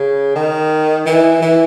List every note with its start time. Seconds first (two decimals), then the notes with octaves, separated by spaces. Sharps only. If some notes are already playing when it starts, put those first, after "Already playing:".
Already playing: C#3
0.36 D#3
1.06 E3
1.42 E3